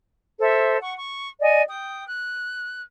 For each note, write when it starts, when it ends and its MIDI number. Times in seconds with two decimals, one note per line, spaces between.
0.39 0.77 69
0.39 0.77 72
0.39 0.77 76
0.81 0.94 78
0.81 0.94 85
0.97 1.29 85
1.41 1.62 74
1.41 1.62 75
1.41 1.62 78
1.41 1.62 80
1.68 2.04 79
1.68 2.04 87
2.07 2.82 90